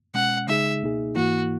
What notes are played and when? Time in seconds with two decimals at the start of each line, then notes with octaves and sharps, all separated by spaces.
0.14 B2 G#3 C#4 F#5
0.48 C#3 G#3 D#4 G#4 E5
0.82 C#2 B2 A#3 D#4 G#4
1.15 G#2 E3 A#3 E4 F#4